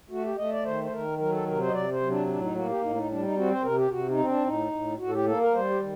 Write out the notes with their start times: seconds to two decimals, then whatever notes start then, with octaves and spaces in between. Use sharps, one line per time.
0.10 A3 F#4
0.24 G4
0.37 A3 D#5
0.51 D5
0.65 D#3 C5
0.84 C5
0.92 D#3 A#4
1.18 F#3 A#4
1.32 A4
1.46 C3 A#4
1.60 C5
1.67 D#5
1.73 C3 D5
1.92 C5
2.01 F#3
2.09 D4
2.28 A2 D4
2.42 D#4
2.55 A#3 F#4
2.69 G4
2.82 A2 D#4
2.95 D#4
3.09 G3 D4
3.23 D#4
3.36 C4 F#4
3.50 C5
3.63 C3 A#4
3.77 G4
3.91 C3 F#4
4.09 D#4
4.18 C4
4.27 D4
4.45 A2 D#4
4.72 A2
4.99 A2 F#4
5.08 A4
5.13 G4
5.26 A#3 A4
5.41 A#4
5.54 G3 C5
5.70 G4
5.81 D#3